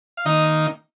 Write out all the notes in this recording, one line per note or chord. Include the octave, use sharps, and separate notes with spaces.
F5
D#3 A#3 D#4 D#5